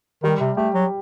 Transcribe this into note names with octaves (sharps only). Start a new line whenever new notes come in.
D#3 G3
C3
A3 G4
F#3